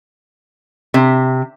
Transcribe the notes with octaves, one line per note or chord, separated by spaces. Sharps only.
C3